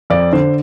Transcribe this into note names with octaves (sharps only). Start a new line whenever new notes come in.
F2 D5
D3 C5